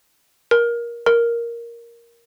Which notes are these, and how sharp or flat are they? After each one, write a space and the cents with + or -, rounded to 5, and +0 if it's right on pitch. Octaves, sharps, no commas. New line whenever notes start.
A#4 +20
A#4 +5